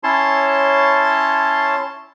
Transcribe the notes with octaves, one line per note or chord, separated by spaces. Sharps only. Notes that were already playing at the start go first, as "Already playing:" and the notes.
C#4 E4 C#5 A5 C6